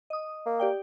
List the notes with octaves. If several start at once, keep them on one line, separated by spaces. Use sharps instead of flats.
D#5 D#6
A#3
G4 D5 G5